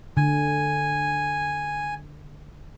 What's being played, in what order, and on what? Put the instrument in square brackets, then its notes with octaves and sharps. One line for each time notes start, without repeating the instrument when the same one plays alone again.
[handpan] D3 [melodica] G#5